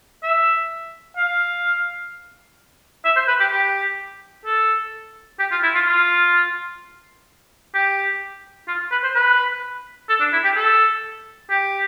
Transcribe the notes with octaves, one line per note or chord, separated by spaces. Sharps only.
E5
F5
E5
C5
B4
G4
G4
A4
G4
F4
E4
F4
F4
G4
F4
B4
C5
B4
A4
D4
E4
G4
A4
G4